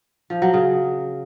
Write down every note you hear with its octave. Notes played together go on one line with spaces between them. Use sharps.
F3
F#3
C#3